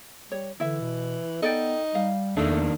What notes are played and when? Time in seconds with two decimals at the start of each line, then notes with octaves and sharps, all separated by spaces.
0.32 G3 C#5
0.60 D3 E3 E4 E5
0.81 B2
1.42 B3 D#4 A4 D5 G5
1.95 G3 F5
2.37 E2 D#3 A3 A#3 D4